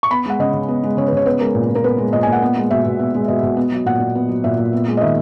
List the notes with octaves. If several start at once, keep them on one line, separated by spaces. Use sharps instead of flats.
C#6
B3 B5
G#3 F#5
C#3 D#5
C#3
B3
G#3
C#3 C#5
B4
C#3 C#5
B3 B4
G#3 A#4
A#2
A#2
A#4
B3 B4
G#3
A#2 D#5
G#5
A#2
F#5
B3
G#3
B2 E5
B2
B3
G#3
B2 D#5
B2
B3
F#3
A#2 F#5
A#2
B3
F#3
A#2 E5
A#2
B3
G#3
D#5
D#3 E5